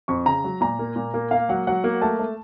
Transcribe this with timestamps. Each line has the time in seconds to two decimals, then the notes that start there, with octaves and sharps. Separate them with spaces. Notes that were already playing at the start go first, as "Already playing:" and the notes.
0.08 F2 C#6
0.26 C#3 A#5
0.44 F#3
0.61 A#2 A#5
0.79 A#3
0.96 A#2
1.14 A#3
1.31 A#3 F5
1.49 F#3 F#5
1.67 F#3 F#5
1.84 A#3
2.02 A3 A5
2.19 A3